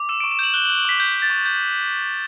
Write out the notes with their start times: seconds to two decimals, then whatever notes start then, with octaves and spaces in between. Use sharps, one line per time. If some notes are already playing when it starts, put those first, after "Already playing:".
Already playing: D6
0.09 E6 E7
0.20 C#6 D7
0.31 E7
0.39 G6 F#7
0.54 F#6 G7
0.65 F#7
0.69 F#6
0.77 F#7
0.85 D6 B6
1.00 G6
1.15 G6
1.22 A6
1.30 C#6
1.46 G6